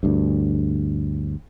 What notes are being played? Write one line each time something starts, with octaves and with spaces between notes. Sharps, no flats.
D2 G2